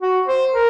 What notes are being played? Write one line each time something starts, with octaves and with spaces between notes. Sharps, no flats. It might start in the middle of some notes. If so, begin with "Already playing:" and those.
F#4
C5
A#4